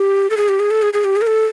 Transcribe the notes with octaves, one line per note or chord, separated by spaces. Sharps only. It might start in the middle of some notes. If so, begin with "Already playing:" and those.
Already playing: G4
A4
G#4
G4
G#4
A4
G#4
G#4
G4
G#4
A#4
A4